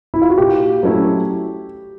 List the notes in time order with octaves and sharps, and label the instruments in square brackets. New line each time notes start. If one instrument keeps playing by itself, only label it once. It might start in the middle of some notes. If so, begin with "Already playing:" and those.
[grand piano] E4
F4
F#4
[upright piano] A#2 [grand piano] G4
[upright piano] F#3 A3 C#4 E4